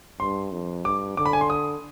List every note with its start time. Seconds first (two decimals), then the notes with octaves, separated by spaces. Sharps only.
0.20 G2 C6
0.52 F2
0.85 G2 D6
1.17 D3 D6
1.26 B5
1.33 G#5
1.41 C6
1.50 D#6